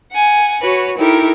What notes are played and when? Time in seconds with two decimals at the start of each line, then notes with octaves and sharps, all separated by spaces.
0.11 F#5 G#5
0.60 F#4 B4 C#5
0.97 D#4 E4 G4 A4 A#4